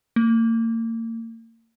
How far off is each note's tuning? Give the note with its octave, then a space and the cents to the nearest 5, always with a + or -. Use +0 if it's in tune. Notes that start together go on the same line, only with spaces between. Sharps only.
A#3 -40